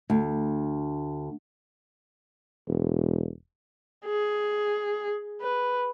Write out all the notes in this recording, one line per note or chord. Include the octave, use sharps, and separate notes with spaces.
D2
E1
G#4
B4